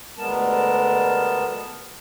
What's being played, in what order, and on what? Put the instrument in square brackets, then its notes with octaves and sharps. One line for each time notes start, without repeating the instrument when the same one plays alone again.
[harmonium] D2 G3 G#3 B3 A#4 A5